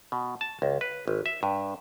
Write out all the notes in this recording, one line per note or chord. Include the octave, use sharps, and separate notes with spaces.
B2
A5
C#2
B4
G#1
E5
G2